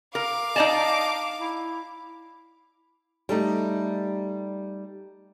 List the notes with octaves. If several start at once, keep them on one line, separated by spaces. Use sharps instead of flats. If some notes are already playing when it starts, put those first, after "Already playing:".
A#4 F5 D6
D#4 D5 D#5 A5
E4
G3 A3 D#4